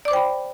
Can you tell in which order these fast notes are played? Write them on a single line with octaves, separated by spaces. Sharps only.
D5 D6 C5 G5 B5